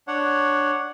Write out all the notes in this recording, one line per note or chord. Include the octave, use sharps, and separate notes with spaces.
D4 C#5 F#5